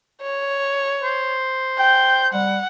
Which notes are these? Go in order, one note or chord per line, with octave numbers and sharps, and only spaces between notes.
C#5
C5
G5 G6
G3 F#5